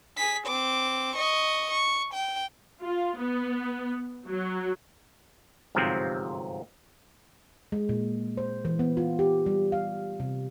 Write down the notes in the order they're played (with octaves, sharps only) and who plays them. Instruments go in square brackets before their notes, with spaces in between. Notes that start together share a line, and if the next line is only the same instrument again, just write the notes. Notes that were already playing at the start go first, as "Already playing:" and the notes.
[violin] G#4 B6
C4 D6
D#5 C#6
C#6
G5
[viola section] F4
B3
F#3
[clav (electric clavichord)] G1 G#2 C3 F3 F#3 C4
[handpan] G#3
A#2
C5
E3
B3
F4
G4
G3
F5
C3